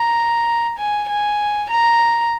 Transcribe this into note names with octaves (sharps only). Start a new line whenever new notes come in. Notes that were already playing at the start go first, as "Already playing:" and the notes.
Already playing: A#5
G#5
G#5
A#5